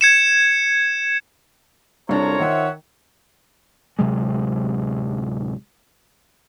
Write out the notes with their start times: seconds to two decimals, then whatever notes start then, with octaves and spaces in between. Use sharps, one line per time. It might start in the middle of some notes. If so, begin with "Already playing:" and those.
0.01 G#6 C#7 E7
2.09 C2 F#2 D4 F4 A4 C5 C#5 A#5
2.40 D#3 E5 F#5
3.99 D1 C3 F#3 G#3